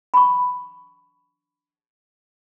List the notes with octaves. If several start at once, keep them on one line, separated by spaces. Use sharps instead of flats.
B5 C#6